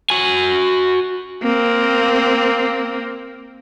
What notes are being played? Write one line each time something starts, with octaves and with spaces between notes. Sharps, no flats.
F#4 G#5
A#3 C4